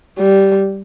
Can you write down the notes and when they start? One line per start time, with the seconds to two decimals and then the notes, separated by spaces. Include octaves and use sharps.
0.19 G3